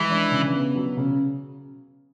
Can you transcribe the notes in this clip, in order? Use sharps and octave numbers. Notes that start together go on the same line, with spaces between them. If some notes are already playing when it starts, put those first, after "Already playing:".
Already playing: E3 G#3
D4
C#3
B3
F#3
C#3